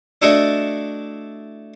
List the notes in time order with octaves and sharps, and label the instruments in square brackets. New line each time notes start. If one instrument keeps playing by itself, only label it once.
[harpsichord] A3 D4 E4 F#4 A4 D#5